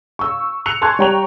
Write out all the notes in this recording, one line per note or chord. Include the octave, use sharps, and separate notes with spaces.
C#6 E6
E6 F#6 C#7 F7
G#5 A5 C6 C#6 F#6 G#6
G3 C#5 G5 A#5 C#6 F7